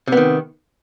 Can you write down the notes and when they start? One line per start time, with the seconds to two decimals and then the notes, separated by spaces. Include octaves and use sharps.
0.08 C3
0.12 B3
0.17 D#3